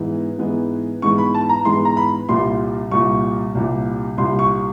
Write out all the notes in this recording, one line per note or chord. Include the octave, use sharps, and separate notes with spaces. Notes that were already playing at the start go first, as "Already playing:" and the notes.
Already playing: G#2 E3 G#3 B3
G#2 E3 G#3 B3
G#2 E3 G#3 B3 C#6
B5
A5
A#5
G#2 E3 G#3 B3 C6
A#5
B5
C2 A#2 G3 C6
C2 A#2 G3 C#6
C2 A#2 G3
C2 A#2 G3 C6
C#6